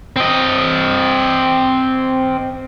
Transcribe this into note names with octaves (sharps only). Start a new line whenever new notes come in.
C4 D#5